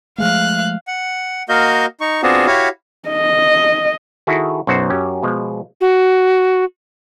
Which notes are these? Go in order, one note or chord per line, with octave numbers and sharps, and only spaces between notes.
F3 G#3 A3 F5 F#6
F#5
A#3 F#4 D#5 F5 G6
D#4 C#6
B3 C4 D4 F4 F#4 G#4
E4 F#4 G4 C#5 F5
D#5
D#3 E4 F#4 G#4 A4
B1 F#2 F#4 C5 F#5
F#2 C#4 G4
B2 F3 G#3
F#4